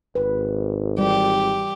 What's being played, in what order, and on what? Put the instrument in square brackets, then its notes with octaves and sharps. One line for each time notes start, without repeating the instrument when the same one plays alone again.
[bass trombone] G#1 [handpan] B4
[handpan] E3 G3 [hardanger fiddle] G4